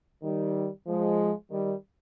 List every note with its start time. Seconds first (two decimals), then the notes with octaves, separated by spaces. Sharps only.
0.23 D#3 G3
0.87 F3 G#3
1.50 D#3 G3